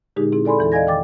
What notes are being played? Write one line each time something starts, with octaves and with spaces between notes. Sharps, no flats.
A#2 D3 G#3 D#4 G4 G#4
C4 E4 G#4
A4 D5 G#5 B5 C6
E2 E3 A4
D5 D#5 F5 G#5 G#6 A#6
D#3 G5 D6 A6